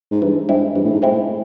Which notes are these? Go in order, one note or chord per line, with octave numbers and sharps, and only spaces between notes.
G#2
G2 E3
G2 G#3 C4 E4
G2 E3
A2
G#2
G#3 C4 E4
A2